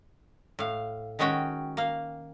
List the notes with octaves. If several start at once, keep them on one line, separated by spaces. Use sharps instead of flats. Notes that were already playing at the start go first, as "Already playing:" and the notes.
A2 F5
D#3 G#3 C#4 F#4 G5
A#3 F5